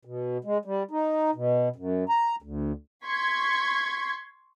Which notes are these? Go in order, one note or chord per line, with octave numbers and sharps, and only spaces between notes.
B2
G#3
G3
D#4
B2
F#2
A#5
D2
C6 C#6 G#6 B6